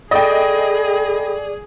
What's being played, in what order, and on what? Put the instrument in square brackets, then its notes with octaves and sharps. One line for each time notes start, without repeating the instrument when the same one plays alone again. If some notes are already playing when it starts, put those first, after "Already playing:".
[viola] G#4 [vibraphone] A4 B5 [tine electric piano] D5 D6 [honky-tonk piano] D#5 G5